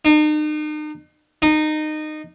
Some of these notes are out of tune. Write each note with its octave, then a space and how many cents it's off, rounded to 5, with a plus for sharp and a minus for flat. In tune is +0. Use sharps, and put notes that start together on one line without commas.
D#4 -40
D#4 -20